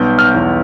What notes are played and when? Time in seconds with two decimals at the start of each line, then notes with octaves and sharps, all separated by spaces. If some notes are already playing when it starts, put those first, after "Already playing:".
Already playing: B1 G3 B3 G6
0.18 F6
0.34 E2